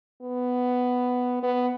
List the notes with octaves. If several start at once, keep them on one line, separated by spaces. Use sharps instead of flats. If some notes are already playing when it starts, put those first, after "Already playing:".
B3
B3